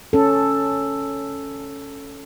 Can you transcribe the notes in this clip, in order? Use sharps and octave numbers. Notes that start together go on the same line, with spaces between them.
C#4 A4